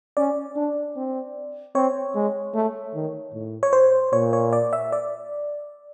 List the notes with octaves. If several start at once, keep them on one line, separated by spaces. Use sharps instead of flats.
C#4 D5
D4
C4
C4 C#5
G#3
A3
D#3
A2
C#5
C5
A#2 C#5
C#5
D5
E5
D5